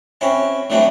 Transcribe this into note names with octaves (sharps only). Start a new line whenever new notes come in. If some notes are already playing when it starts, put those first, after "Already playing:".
C4 C#4 E4 F#4
D3 E3 F#3 G3 A3 C4